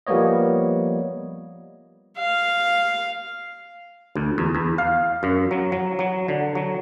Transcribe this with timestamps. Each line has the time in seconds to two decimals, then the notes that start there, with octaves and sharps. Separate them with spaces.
0.07 F3 G3 A#3 B3 C#5 D#5
2.18 F5
4.16 D2
4.38 E2
4.55 E2
4.78 F5
5.23 F#2
5.51 F#3
5.72 F#3
5.99 F#3
6.28 D3
6.55 F#3